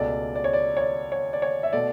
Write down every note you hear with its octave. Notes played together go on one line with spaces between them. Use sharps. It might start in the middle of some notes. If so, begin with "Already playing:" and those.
Already playing: C#2 B2 A3 D5
D5
C#5
D5
C#5
D5
C#5
D5
C#5
E5
B2 A3 D5